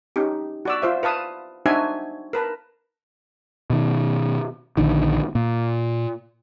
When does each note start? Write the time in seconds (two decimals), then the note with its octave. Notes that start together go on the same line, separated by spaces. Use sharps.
0.16 C#4 D#4 G4
0.65 F#4 D5 E6
0.82 F4 C5 E5
1.03 B4 F5 A5 D#6
1.66 D4 D#4 F#4 C5 E5 G#5
2.33 A#4 B4 A5
3.70 B2 D#3
4.77 A#1 D3 D#3
5.35 A#2